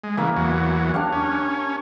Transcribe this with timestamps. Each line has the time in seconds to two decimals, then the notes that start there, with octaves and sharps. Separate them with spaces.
0.04 G#3
0.18 C#3 E3 A#3
0.37 E2 F#3
0.94 D4 G4 F5
1.13 C#4